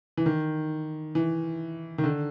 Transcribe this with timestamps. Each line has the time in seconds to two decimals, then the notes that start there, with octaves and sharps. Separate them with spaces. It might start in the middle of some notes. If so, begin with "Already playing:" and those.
0.17 E3
0.26 D#3
1.15 E3
1.98 D#3
2.04 D3